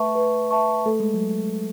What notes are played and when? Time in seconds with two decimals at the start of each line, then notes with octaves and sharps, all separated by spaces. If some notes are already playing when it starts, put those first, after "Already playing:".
Already playing: A3 B4 E5 A5 C#6
0.15 B4
0.51 E5 A5 C#6
0.86 A3 A4
1.00 G#3
1.14 F#3